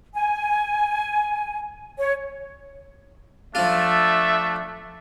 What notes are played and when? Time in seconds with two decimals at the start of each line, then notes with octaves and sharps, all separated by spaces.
0.14 G#5
1.98 C#5
3.55 F3 A3 D4 F4 E5